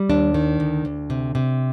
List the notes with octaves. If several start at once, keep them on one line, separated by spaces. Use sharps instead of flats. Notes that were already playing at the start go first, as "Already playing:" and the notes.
Already playing: G3
D#2 D4
D#3
D2
D2
C3
C3